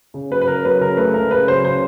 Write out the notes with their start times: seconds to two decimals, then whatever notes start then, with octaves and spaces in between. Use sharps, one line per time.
0.14 C#3
0.31 F#3 B4
0.42 B4
0.47 C#3 A#4
0.65 F#3 B4
0.81 C#3 A#4
0.97 A3 B4
1.14 C#2 A#4
1.31 C#3 B4
1.48 F#3 C5
1.64 C#3 C5